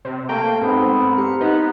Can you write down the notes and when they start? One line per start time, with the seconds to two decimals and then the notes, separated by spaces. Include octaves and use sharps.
0.05 C3
0.29 A3 A#3 G5
0.61 G#2 B3 C4 C5
1.02 A#4
1.18 G4 C#7
1.41 B3 D#4 B4